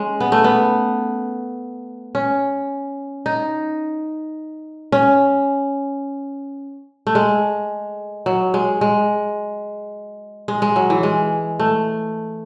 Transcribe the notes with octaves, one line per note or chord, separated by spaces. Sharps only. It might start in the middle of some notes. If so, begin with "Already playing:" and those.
Already playing: G#3 C#4
B3
A3
B3
C#4
D#4
C#4
A3
G#3
F#3
G#3
G#3
G#3
G#3
F#3
E3
G#3
A3